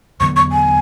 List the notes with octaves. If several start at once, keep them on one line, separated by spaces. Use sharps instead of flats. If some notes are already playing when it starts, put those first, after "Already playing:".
E2 D3 F#3 B3 C#6
C#6
G#5